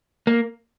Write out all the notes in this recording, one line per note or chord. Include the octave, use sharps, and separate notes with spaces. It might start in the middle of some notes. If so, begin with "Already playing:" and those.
A#3